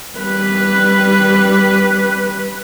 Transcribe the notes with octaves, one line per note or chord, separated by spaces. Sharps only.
G3 B4